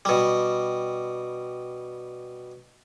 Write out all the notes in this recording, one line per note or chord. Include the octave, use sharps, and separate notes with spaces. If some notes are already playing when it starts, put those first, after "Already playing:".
B2 G3